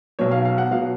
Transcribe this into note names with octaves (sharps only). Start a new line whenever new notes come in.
B1 B2 F#3 C#5
F5
F5
F#5
B2 F#3 F5